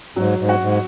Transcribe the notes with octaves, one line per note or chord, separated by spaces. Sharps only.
G#2 F#3
G#2
F#4
G#2